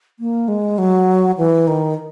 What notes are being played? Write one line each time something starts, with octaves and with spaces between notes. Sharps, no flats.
A#3
G#3
F#3
E3
D#3